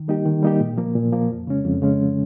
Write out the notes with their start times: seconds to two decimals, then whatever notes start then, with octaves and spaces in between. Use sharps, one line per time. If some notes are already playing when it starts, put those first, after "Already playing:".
Already playing: D#3
0.08 G3 A#3 D#4 G4
0.25 D#3
0.43 G3 A#3 D#4 G4
0.60 A#2
0.77 F3 A#3
0.96 A#2
1.13 F3 A#3
1.30 F2
1.47 C#3 G#3 C#4
1.65 F2
1.82 C#3 G#3 C#4